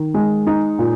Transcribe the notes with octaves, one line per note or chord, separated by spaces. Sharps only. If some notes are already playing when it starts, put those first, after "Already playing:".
Already playing: D#3
G#3
D#4
A#2